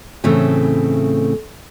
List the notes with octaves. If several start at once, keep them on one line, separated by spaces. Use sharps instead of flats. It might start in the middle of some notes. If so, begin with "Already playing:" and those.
A2 C#3 E3 A3 C4